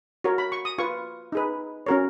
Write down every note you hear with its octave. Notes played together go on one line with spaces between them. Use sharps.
F#4 A#4 C#5
B5
C#6
D#6
F4 B4 C#6
D#4 G#4 B4
C#4 F#4 A#4 C#5